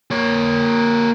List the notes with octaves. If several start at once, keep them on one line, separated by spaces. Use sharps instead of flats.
A#3 C#5